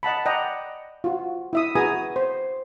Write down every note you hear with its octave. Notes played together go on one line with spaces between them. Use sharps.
D#5 F#5 A5 B5
D5 D#5 F#5 G5 A#5
F4 F#4
E4 E5 D#6
F#4 G#4 B4 G#5 A#5 D#6
C5